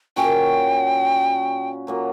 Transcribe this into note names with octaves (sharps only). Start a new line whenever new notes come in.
A#2 F#3 C#4 G5
A#2 F#3 A#3